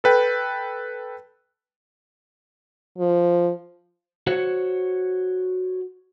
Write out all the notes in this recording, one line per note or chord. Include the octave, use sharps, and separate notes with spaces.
A4 B4 G5
F3
F#4 C5 C#5 F#5